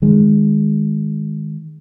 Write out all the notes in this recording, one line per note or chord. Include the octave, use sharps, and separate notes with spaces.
D#3 G#3